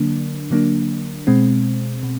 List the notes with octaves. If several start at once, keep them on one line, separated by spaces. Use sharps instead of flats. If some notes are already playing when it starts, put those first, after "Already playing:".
Already playing: D3 F#3 A#3 D4
D3 F#3 A#3 D4
B2 G#3 C4
B2